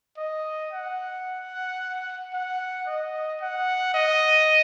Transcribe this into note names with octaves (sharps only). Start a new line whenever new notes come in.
D#5
F#5
F#5
D#5
F#5
D#5